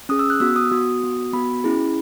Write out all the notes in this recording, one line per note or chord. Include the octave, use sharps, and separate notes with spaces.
C#4 G#4 D#6
E6
F#6
B3 F#4 E6
D#6
B3 F#4
B3 F#4
B3 F#4 B5
C#4 E4 G#4